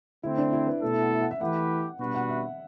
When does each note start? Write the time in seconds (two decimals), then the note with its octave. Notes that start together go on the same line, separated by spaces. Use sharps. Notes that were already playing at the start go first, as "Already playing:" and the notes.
0.23 D3 A3 C4 E4
0.38 D4
0.53 E4
0.67 B4
0.82 B2 A3 E4 A4
0.92 E5
1.02 F#5
1.12 E5
1.21 F#5
1.31 E5
1.41 E3 A3 E4 G4 B4 F#5
1.99 B2 G3 D4 F#4 B4
2.15 F#5
2.29 E5